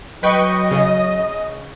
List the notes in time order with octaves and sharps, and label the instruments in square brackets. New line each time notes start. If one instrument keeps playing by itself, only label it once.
[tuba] F#3 [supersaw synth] B4 G5 C#6 [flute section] D#5
[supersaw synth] C#3